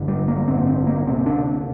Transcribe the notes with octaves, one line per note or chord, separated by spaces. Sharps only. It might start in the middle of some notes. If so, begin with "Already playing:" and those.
Already playing: A1 G2 D3
G3
A#3
A1 G2 D3 C4
C4
A#3
D2 C3 C4
D4